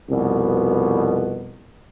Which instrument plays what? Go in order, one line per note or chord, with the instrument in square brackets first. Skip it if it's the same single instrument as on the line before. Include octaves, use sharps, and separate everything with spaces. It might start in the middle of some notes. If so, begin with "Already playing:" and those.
[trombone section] C2 F2 B2